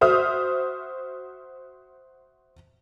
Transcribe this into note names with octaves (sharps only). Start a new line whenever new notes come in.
F#4 C5 E5 D#6 F6